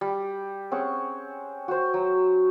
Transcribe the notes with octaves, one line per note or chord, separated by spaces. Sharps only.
G3
C4 C#4 G#4 F#5
F#4 C5
F#3